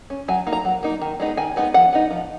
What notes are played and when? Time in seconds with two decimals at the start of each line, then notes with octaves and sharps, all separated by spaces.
0.10 C#4
0.28 F#3 G#5
0.47 A#3 D#4
0.53 A#5
0.65 F#3
0.83 A#3 D#4
1.01 D#3
1.20 G#3 B3 D#4
1.37 D#3 G#5
1.56 G#3 B3 D#4
1.74 F3 F#5
1.93 B3 D#4
2.11 F3